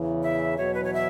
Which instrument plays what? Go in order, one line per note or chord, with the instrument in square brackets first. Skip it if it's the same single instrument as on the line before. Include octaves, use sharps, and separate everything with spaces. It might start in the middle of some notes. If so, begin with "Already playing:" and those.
Already playing: [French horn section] E2 C#3 E3
[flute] E5
[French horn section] E2 B2 F#3 [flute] C#5
[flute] B4
C#5
E5